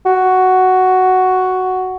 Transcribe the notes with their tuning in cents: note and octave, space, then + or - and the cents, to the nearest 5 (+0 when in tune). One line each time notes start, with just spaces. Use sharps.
F#4 +5